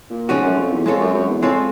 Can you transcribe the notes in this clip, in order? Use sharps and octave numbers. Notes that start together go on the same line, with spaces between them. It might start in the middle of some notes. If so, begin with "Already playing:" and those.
A#2
G#2 F3 A3 C#4 F#4
F#2
F2
E2
F2 G#3 C4 F4 A4 C#5
F#2
F#2
E2
F2 G#3 C4 F4 A4 C#5